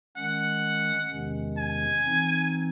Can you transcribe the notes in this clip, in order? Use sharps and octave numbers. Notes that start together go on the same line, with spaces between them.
D#3 G#3 C#4 F#5
E2 C3 D#3 G#3 C#4
G#5
E3 C4 D#4